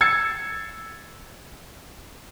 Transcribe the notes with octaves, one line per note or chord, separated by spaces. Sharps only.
E6 G#6 A6 C7 C#7